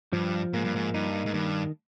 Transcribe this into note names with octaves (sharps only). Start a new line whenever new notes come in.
G2 F3
G#2 A#3
G2
G#2
G2 D#4
G#2
G2 D#3